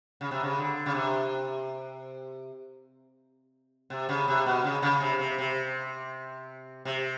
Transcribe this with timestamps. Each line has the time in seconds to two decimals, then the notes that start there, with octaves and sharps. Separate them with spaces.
0.21 C#3
0.31 C3
0.43 C#3
0.58 D3
0.86 C#3
0.94 C3
3.90 C3
4.09 C#3
4.28 C3
4.46 B2
4.64 C#3
4.82 C#3
5.01 C3
5.19 C3
5.38 C3
6.85 C3